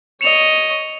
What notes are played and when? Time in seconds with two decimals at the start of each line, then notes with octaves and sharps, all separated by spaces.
0.21 C#5 D#5 C#7 E7 F7